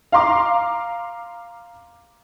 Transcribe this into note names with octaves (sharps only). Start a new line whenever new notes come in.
F5 A#5 C6 D6